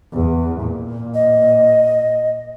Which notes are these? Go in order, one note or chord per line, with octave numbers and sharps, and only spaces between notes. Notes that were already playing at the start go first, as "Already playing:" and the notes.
E2
A#2
D#5